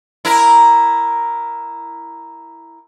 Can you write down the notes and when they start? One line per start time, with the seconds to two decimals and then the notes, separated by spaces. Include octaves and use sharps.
0.25 E4 A#4